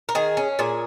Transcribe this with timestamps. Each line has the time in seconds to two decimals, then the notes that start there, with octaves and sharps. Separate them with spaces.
0.09 A#4
0.15 D#3 G#4
0.37 C#4
0.59 A#2 G#4